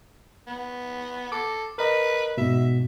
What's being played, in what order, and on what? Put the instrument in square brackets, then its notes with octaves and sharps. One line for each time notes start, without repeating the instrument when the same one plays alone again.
[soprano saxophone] B3
[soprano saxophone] A4 [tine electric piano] D6
[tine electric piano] A#4 D#5 [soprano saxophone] B4
[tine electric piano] G#2 B2 [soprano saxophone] E5